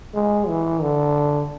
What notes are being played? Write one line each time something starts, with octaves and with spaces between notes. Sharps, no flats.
G#3
E3
D3